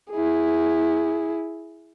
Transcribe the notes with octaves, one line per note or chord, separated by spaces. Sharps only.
E4 G#4